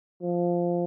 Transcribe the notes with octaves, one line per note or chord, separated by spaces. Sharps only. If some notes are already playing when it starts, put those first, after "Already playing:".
F3